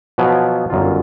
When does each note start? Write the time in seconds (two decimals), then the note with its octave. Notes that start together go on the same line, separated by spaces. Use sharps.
0.18 B2 F3 F#3 B3 G#5
0.70 G1 F#2 D#3 F4